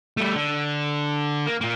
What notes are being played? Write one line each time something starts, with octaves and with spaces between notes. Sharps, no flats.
G3 A3
D3
A#3
A#2 A#3